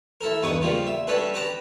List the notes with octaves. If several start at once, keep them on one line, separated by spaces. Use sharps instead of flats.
E4 A4 A#4
E2 G2 D#4 B4 C#6 D#6
C#3 F3 G3 A#3
E5
G3 C#4 D4 A4 B4
G4 B4 A5 A#5 D6